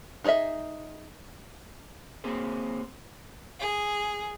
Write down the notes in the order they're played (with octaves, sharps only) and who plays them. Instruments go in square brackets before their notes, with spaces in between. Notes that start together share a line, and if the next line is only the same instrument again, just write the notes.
[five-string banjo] D#4 G#4 C#5 D#5 E5
[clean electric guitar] A#3 C4 G#4 C5
[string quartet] G#4